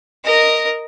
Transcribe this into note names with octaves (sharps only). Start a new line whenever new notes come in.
A#4 D#5